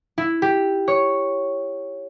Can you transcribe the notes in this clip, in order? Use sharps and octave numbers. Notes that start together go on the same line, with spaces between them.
E4
G4
C#5